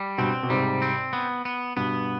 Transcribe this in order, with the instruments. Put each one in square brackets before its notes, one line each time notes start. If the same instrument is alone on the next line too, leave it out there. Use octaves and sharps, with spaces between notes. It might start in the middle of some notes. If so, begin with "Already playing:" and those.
Already playing: [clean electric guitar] G3
[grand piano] G2 B2 [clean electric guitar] C4
[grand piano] B2
[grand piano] G#2 C3 [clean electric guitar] G3
[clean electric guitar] C4
B3
B3
[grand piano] G2 B2 [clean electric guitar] B3